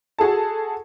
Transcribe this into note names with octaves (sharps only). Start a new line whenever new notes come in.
F#4 G#4 A4 A5